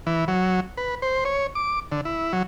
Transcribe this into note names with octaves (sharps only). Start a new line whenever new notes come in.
E3
F#3
B4
C5
C#5
D6
D3
E4
F#3